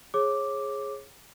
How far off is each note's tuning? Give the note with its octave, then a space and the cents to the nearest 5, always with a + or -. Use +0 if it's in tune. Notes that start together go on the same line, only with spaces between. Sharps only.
G#4 +0 C#5 -30 D6 +0